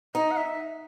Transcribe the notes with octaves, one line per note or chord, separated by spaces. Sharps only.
D#4 D#5
F#5
E5